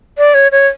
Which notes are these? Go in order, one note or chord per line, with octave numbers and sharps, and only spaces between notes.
D5
C#5
C#5